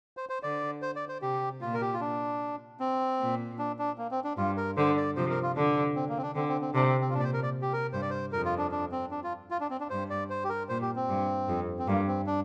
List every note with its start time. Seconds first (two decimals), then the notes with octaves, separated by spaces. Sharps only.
0.17 C5
0.29 C5
0.43 D3 D5
0.82 C5
0.96 D5
1.09 C5
1.22 C3 G4
1.61 A#2 F4
1.74 A#4
1.81 G4
1.94 F4
2.01 D4
2.80 C4
3.19 A#2
3.58 D4
3.79 D4
3.98 A#3
4.11 C4
4.24 D4
4.37 G2 F4
4.57 A#4
4.77 D3 C5
4.97 D5
5.16 C3 F3 C5
5.30 A#4
5.43 F4
5.56 D3 D4
5.96 C4
6.09 A#3
6.17 C4
6.22 D4
6.35 D3 C4
6.48 C4
6.61 C4
6.74 C3 D4
6.88 C4
7.01 C4
7.09 F4
7.14 A#2 D4
7.19 D5
7.24 C5
7.33 A#4
7.43 D5
7.62 G4
7.73 A#4
7.93 G2 C5
8.02 D5
8.10 C5
8.32 F2 A#4
8.45 F4
8.58 D4
8.71 D4
8.92 C4
9.11 D4
9.24 F4
9.51 F4
9.60 D4
9.70 C4
9.80 D4
9.90 G2 C5
10.10 D5
10.30 C5
10.44 G4
10.49 A#4
10.69 A#2 C5
10.82 G4
10.96 C4
11.08 G2
11.48 F2
11.79 C4
11.87 G2 A#3
12.08 C4
12.27 D4